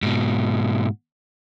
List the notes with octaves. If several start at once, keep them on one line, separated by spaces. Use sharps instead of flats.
G#2 B2